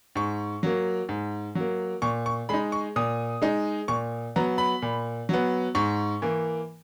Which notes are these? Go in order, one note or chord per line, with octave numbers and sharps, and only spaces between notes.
G#2 C#6
F#3 A#3
G#2
F#3 A#3
A#2 C#6
C#6
G#3 D#4 B5
C#6
A#2 D#6
G#3 D#4
A#2 C#6
F#3 B3 A#5
B5
A#2
F#3 B3
G#2 C#6
E3 A#3